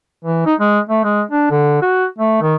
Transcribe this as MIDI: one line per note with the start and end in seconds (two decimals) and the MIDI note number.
0.25 0.42 52
0.46 0.55 63
0.60 0.80 56
0.89 1.02 57
1.04 1.22 56
1.31 1.50 62
1.51 1.78 50
1.82 2.05 66
2.18 2.39 57
2.42 2.56 51